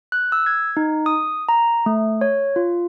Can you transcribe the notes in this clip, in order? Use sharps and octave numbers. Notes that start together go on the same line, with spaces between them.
F#6
E6
G#6
D#4
D#6
A#5
A3
C#5
F4